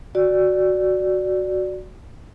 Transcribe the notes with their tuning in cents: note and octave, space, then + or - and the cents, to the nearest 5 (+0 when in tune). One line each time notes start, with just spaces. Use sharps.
F#4 +0 D5 +0